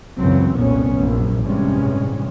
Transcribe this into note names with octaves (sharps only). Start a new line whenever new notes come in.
C#2 F#2 C#3 E3 F#3 C4
F1 C2 F2 A#2 B3 C#4
A#1 F#2
A1 G2 C3 G#3 C#4